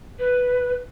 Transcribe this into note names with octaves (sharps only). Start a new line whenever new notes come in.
B4